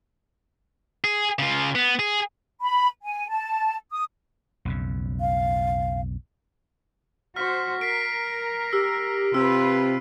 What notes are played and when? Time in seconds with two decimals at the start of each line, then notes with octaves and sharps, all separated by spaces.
1.04 G#4
1.39 C#3 F4
1.75 B3
1.99 G#4
2.61 B5
3.03 G#5
3.29 A5
3.92 D#6
4.65 B1 F2 C#3
5.20 F5
7.36 F#4 C5 F6 B6
7.81 A#4 B6 C7 D7
8.73 G4 E6
9.34 C3 C4 F4 B4 E6